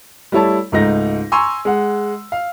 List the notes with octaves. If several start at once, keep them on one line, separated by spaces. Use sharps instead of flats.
G3 A3 E4 C#5 A5
C#2 G#2 A3 D#4 A#6
G#5 A#5 C6 C#6 E6
G#3 F#5
F5